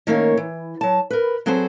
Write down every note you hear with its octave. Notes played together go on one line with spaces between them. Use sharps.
D#3 A3 A#3 C#4 A#4 C#5
E3
F#3 A5
A#4 B4
F#3 C4 G#4 A4 B4 C5